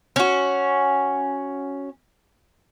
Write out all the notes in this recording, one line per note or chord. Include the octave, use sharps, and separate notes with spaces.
C#4 F#4